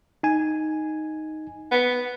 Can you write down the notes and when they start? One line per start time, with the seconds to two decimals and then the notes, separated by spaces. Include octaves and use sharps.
0.23 D#4 G#5
1.72 B3